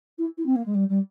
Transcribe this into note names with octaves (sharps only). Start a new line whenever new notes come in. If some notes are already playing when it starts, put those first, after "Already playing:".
E4
E4
C4
A#3
G#3
G3
G3